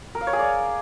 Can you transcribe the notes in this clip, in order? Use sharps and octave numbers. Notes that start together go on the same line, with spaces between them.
A#4
F5
C#5
G#4
D5